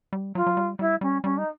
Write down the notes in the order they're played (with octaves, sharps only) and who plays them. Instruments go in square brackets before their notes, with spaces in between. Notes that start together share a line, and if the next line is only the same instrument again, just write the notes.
[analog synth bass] G3
[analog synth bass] F#3 [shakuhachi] F4
[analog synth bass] F#3
G3
[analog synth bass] G3 [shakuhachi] E4
[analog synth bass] G3 [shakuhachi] C#4
[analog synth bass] G3 [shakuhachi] C#4
[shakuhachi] D#4